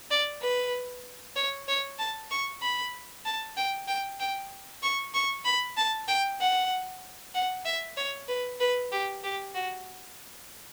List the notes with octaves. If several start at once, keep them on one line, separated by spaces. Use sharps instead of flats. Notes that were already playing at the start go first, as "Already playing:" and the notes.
D5
B4
C#5
C#5
A5
C#6
B5
A5
G5
G5
G5
C#6
C#6
B5
A5
G5
F#5
F#5
E5
C#5
B4
B4
G4
G4
F#4